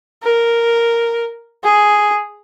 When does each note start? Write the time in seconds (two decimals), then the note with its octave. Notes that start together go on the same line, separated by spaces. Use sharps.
0.23 A#4
1.63 G#4